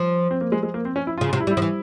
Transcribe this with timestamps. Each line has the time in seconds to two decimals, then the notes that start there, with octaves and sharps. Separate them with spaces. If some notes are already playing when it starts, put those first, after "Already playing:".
Already playing: F3
0.31 C4
0.41 A#3
0.52 G#3
0.63 G#3
0.74 A#3
0.85 C4
0.96 C#4
1.07 E4
1.18 F4
1.21 C#3
1.29 F4
1.33 C3
1.40 E4
1.47 G3
1.51 E4
1.57 F3
1.62 E3